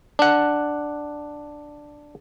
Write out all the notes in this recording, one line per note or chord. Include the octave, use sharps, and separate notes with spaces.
D4 F#5